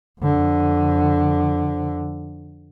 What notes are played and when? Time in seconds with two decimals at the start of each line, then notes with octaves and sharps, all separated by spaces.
0.21 F2 D3